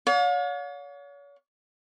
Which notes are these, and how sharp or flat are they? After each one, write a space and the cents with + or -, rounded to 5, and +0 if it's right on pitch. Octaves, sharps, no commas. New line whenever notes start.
C#5 +40 F5 +45